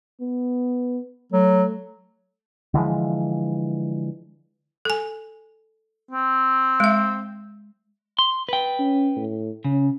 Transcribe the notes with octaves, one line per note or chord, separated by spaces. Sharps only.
B3
F#3 A3
D3 E3 F3 G#3
A4 G#5
C4
G#3 E5
C6
B4 G5
C#4
A2
C#3 C#4